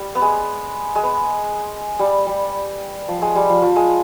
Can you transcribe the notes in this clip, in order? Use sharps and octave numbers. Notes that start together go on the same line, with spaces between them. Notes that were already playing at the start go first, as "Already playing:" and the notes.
Already playing: G3
B3
G#3
G#3
B3
G3
G3
F3
G#3
G3
F3
F3
G#3